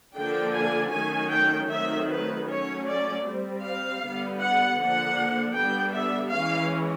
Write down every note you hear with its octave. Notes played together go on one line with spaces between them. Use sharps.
D3 F3 A#3 D4 G5
G#5
D#3 F#3 A3 C#4 G#5
G5
D#3 F#3 A3 C4 E5
B4
F#3 A3 C#4 C#5
D5
G3 C4
F5
D3 G3 B3
F#5
D3 F3 A#3 D4 F#5
D3 G3 B3 D4 G5
E5
E3 G#3 C#4 F5